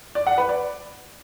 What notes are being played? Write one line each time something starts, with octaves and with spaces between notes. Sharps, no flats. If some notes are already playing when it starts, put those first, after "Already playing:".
D5
F#5
B4
D5